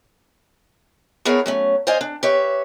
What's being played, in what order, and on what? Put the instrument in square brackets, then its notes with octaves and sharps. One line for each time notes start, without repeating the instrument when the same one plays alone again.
[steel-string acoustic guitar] B3 D4 E4 G#4 A#4 C#5
F#3 A3 C#4
C5 D5 D#5 F5 G#5
D4
G4 B4 C#5 E5